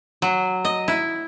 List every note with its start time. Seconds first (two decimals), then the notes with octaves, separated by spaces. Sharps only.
0.22 F#3
0.65 D#5
0.88 E4